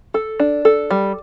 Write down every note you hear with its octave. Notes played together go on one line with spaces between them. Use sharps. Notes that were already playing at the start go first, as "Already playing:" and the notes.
A4
D4
A4
G3